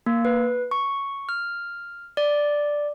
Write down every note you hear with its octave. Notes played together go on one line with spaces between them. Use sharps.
A#3
B4
C#6
F6
D5